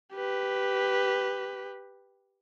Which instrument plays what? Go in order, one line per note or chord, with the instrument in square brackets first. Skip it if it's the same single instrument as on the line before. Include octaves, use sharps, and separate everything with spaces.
[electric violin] G4 B4